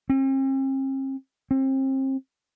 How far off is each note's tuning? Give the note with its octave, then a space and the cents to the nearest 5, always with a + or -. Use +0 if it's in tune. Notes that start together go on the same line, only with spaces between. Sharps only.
C4 +45
C4 +35